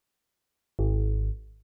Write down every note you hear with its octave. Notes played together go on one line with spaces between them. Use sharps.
G#1